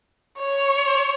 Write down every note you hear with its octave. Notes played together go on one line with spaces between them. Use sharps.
C#5